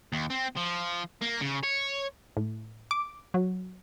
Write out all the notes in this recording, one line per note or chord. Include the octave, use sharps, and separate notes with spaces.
D#2
C4
F3
A#3
C#3
C#5
A2
D6
F#3